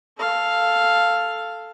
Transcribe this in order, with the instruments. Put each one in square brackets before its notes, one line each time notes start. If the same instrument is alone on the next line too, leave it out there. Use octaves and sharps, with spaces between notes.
[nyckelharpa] A4 F5